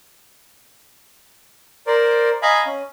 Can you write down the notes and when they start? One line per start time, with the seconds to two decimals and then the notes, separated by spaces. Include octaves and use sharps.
1.87 A#4 C5 D5
2.42 D#5 F5 G#5 A#5 B5
2.66 C#4